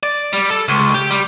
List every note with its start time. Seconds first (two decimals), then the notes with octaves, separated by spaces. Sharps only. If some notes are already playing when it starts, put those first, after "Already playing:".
0.03 D5
0.33 G3
0.50 A4
0.68 C#2
0.94 G4
1.11 G3